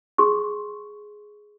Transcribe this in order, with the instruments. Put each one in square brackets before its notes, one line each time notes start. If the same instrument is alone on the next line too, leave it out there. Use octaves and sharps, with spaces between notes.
[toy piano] G#4 C6 C#6